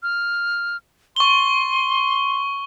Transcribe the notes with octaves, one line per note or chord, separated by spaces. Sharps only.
F6
C6 C#6 G7